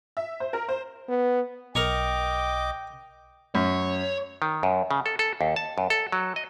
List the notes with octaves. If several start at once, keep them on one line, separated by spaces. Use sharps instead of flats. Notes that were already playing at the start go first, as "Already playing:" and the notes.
E5
C5
A#4
C5
B3
B1 A#4 D#5 G5 A#5 C#6 D6
F#2 C#5
D#3
F#2
C#3
A4
A4
D#2
A5
F#2
A4
F#3
D#5